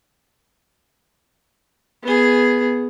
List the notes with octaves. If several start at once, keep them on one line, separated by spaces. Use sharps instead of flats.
B3 G#4